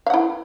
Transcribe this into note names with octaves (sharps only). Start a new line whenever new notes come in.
E4 F5 F#5